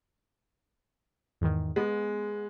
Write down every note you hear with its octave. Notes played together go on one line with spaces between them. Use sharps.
E2 G#2 D#3
G#3 B3